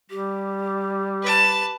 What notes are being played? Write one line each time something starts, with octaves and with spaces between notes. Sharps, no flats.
G3 G4
B4 A5